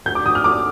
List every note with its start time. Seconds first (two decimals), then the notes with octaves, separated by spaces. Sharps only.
0.06 D2 G6
0.15 D6
0.26 D2 D#6
0.35 F6
0.44 D2 D6